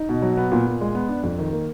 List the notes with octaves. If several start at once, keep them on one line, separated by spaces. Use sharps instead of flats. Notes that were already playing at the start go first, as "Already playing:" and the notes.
Already playing: D#4
B2
F#3
B3
A#2
A#2
G#3
B3
D4
F2
D#3
A#3